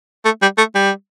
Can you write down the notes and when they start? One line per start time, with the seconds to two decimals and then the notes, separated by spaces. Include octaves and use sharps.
0.25 A3
0.42 G3
0.58 A3
0.75 G3